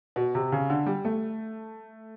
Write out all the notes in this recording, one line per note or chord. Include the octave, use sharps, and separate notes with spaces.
B2
C3
C#3
D3
G3
A3